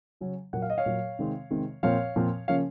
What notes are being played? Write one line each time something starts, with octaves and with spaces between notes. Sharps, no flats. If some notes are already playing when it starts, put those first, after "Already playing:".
C#3 F#3 C#4
A#2 F#3 A#3 F#5
F5
D#5
C#5 F5
A#2 F#3 A#3
C3 D#3 G#3 C4
C3 D#3 G#3 C4
A#2 F3 C4 C#5 F5
A#2 F3 C4
C#3 F3 A#3 C#4 C#5 F5